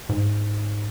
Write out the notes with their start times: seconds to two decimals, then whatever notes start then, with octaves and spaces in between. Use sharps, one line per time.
0.09 G#2